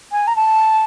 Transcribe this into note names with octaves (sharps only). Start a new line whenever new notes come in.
G#5
A#5
A5